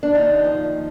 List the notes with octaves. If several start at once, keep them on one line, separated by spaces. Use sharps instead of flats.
D4
D#2 D#4
F3